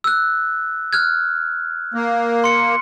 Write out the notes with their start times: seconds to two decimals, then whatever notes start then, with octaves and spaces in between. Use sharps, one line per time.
0.04 E6 F#6
0.93 F6 F#6 G#6
1.94 A#3
2.44 C6 C#7